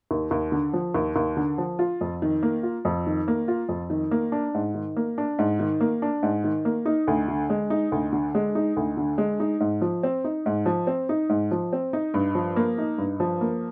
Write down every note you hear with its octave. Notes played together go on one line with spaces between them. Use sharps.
D#2
D#2
D3
F3
D#2
D#2
D3
F3
F4
F2
D#3
A#3
F4
F2
D#3
A#3
F4
F2
D#3
A#3
D4
G#2
D#3
A#3
D4
G#2
D#3
A#3
D4
G#2
D#3
A#3
D#4
D2
D3
G#3
D#4
D2
D3
G#3
D#4
D2
D3
G#3
D#4
G#2
F3
C4
D#4
G#2
F3
C4
D#4
G#2
F3
C4
D#4
G2
F3
A#3
D#4
G2
F3
A#3